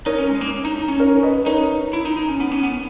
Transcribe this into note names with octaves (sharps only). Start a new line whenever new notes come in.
D#4 A#4 C#5
C#4
G#3
A#3
D#4
D#4
C#4
A#4 C#5
B4 D#5
D#4 A#4 C#5
E4
D#4
D#4
C#4
B3
C#4
B3